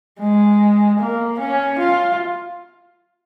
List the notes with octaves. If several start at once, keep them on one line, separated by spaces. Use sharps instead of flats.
G#3
A#3
C#4
F4